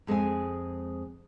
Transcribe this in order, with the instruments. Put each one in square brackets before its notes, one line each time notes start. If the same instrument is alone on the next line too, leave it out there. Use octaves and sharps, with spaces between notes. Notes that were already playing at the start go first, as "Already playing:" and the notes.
[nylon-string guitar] F2 G#3 C4 G#4 G#5